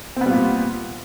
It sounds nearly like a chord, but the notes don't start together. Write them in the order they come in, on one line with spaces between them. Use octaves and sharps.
C4 B3 G3 A#2